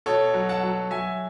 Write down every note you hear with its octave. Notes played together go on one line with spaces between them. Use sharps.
B2 A4 C#5
F#3
F#5 A5
F#3
F#3 E5 G#5